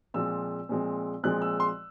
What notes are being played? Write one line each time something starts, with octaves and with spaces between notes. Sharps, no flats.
A#2 F3 G#3 C4 E6
A#2 F3 G#3 C4
A#2 F3 G#3 C4 F#6
E6
C6